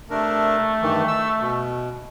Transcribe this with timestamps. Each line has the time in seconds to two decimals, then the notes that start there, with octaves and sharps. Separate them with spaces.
0.10 C3 A3 D4 A#4
0.82 G2 D#3 E3
1.08 E6
1.41 B2